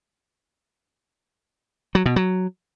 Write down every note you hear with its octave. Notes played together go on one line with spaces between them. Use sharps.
F#3
B2
F#3